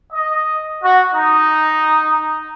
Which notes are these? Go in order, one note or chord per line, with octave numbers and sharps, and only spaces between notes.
D#5
F#4
D#4